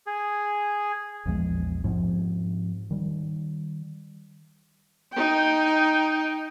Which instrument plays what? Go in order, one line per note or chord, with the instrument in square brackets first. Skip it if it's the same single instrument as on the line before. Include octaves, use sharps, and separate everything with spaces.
[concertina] G#4
[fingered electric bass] A#1 E2 F3 G#3
G#2 F3 C4
D#3 G3
[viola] D#4 G5